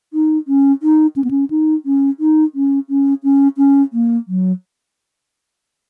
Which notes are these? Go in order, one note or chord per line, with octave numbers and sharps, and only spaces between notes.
D#4
C#4
D#4
C#4
B3
C#4
D#4
C#4
D#4
C#4
C#4
C#4
C#4
A#3
F#3